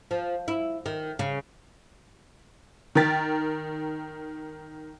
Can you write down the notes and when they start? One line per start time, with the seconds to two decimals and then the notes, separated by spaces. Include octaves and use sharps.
0.11 F3
0.48 E4
0.86 D#3
1.19 C#3
2.95 D#3 A#4 G5 A6 B6